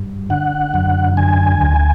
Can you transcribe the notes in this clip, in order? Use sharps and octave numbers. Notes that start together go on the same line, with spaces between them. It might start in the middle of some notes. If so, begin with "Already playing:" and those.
Already playing: G2
D3 F#5
F#2
D3 G#5
D2